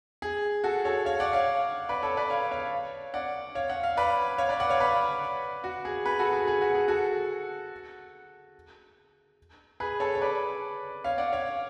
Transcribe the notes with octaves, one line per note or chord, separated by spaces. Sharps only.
G#4
F#4 A4
A4 C#5
C#5 F5
D5 F#5
C#5 F5
B4 D5
A4 C#5
B4 D5
C#5 F5
C#5 F5
D5 F#5
C#5 F5
F#5
F5
B4 D5
C#5 F5
B4 D5
D5 F#5
C#5 F5
B4 D5
F#4
G#4
G#4 B4
F#4 A4
G#4
G#4
F#4
G#4
F#4 A4
G#4 B4
A4 C#5
C#5
B4 D5
C#5 F5
D5 F#5
C#5 F5